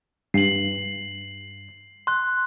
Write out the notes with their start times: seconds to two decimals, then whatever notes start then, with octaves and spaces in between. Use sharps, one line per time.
0.34 G2 C7 F#7
2.07 C6 F#6